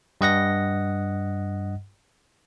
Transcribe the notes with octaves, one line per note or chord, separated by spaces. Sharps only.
G2 D#5 F#5 A#6